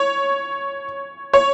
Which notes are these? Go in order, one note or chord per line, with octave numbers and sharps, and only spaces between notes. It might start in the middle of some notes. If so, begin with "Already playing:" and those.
Already playing: C#5
C#5